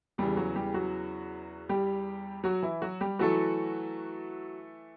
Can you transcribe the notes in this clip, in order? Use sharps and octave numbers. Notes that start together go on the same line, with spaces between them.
E2 C#3 E3 G3 G4
F#3 F#4
G3 G4
F#3 F#4
G3 G4
F#3 F#4
E3 E4
F#3 F#4
G3 G4
E3 F#3 A3 E4 F#4 A4